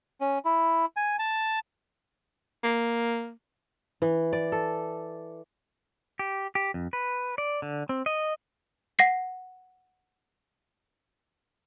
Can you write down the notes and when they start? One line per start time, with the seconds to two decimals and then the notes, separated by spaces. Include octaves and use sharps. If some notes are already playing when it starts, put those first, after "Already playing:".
0.21 C#4
0.45 E4
0.97 G#5
1.19 A5
2.64 A#3
4.02 E3
4.33 D5
4.52 A4
6.19 G4
6.55 G4
6.74 F2
6.93 B4
7.38 D5
7.62 D3
7.89 C4
8.06 D#5
8.99 F#5 A#6 C7